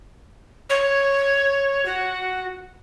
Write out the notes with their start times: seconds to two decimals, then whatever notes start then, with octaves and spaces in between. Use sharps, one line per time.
0.70 C#5
1.86 F#4